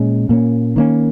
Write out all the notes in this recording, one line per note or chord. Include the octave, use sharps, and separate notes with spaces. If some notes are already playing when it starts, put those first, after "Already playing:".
Already playing: A#2 G#3 C#4
A#2 A#3 C#4
D#3 A#3 C#4